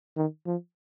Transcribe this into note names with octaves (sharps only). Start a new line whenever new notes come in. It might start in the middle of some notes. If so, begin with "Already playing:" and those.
D#3
F3